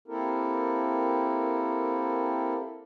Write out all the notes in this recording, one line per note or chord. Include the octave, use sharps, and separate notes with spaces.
A#3 C4 E4 G4 A4 A#4